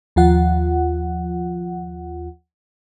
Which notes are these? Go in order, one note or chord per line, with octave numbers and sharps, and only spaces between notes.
D#2 F3 F4 F#5